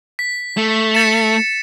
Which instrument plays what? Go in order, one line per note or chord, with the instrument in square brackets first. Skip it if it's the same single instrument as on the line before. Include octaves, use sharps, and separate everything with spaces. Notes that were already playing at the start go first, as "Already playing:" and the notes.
[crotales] B6
[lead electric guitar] A3
[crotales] A6 C#7 E7